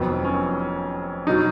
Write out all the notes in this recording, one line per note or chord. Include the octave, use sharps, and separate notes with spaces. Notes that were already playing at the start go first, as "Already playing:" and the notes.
Already playing: F1 F2 D#3 F#3 B3
C#4
B2 F#3 D#4